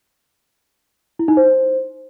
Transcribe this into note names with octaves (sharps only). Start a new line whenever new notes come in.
E4
D#4
C5